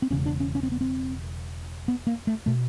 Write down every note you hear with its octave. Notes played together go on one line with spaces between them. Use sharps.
C4
E1 E2 C#3 C#4
D4
C#4
C#4
C4
B3
C4
B3
A#3
A3
B2 A3